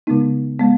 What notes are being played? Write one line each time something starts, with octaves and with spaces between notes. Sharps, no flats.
C#3 G#3 B3 D#4
G#3 B3